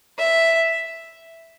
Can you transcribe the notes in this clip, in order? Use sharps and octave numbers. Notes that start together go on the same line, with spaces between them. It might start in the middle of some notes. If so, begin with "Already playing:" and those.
E5